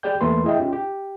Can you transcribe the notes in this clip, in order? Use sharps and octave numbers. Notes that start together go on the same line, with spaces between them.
G4 G#4 D5 G5 G6
E2 A3 A#3 B4 C6
E4 G#4 D#5 E5 G5
C#4 D#4 F4 G4
G4